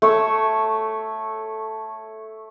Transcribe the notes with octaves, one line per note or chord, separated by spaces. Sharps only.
A3 C#5 E6